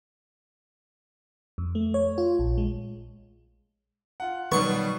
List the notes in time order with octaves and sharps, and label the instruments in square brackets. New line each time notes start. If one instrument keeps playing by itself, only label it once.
[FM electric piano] F2
A3
C#5
F4
A#1
G#3
[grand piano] F4 F#5
[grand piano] B2 D#4 [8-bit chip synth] D#3 F#3 G3 [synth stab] B3 [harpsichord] C#6